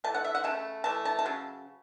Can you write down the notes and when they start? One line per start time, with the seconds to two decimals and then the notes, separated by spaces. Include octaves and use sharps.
0.04 E3 A3 A5
0.14 F#5
0.24 E5
0.35 F#5
0.44 C#3 A3 A5
0.84 E3 A3 A5
1.05 A5
1.19 A5
1.25 C#3 F#3